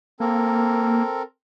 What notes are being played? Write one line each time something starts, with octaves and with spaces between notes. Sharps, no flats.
A#3 C4 A4 A#4